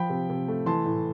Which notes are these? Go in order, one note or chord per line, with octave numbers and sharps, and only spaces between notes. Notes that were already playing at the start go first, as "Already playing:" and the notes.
Already playing: F3 G5 B5
C3
C3
A3
E3 A5 C6
A2